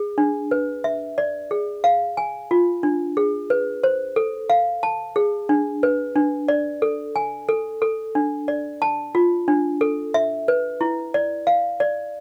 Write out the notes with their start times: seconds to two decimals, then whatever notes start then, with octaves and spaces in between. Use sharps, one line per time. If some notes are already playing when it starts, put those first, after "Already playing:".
Already playing: G#4
0.18 D4
0.51 B4
0.84 E5
1.18 D5
1.51 G#4
1.84 F5
2.17 G#5
2.51 F4
2.83 D4
3.17 G#4
3.50 B4
3.84 C5
4.16 A4
4.50 F5
4.83 A5
5.16 G#4
5.49 D4
5.83 B4
6.16 D4
6.48 D5
6.82 A4
7.16 G#5
7.49 A4
7.82 A4
8.15 D4
8.48 D5
8.82 A5
9.15 F4
9.48 D4
9.81 A4
10.14 E5
10.48 B4
10.81 E4
11.14 D5
11.47 F5
11.80 D5